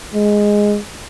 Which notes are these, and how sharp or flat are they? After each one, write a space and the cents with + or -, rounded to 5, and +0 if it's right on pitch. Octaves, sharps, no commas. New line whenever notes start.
G#3 -5